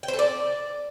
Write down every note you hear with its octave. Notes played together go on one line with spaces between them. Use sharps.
G5
C5
A4
D5